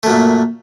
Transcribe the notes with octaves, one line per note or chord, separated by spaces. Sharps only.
F#2 A#2 A3